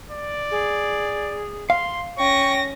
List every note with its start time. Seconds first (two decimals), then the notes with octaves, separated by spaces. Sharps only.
0.11 D5
0.50 G#4
1.70 F5 C6
2.18 C#4 G5 C#6 A#6